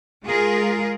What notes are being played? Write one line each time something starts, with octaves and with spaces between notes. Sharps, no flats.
G#3 F4 G#4 A#4